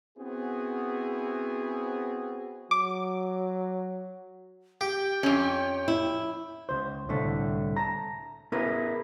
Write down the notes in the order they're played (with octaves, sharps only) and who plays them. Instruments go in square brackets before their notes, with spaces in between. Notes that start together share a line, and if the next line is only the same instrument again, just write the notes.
[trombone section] B3 C4 E4 F#4 G#4
[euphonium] F#3 [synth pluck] D6
[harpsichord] G4 [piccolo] G5
[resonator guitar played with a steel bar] F2 C#4
[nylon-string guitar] E4
[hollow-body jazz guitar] C#2 C5
C2 A2 D3 A3
A5 A#5
B3 E4 G#4 A#4 B4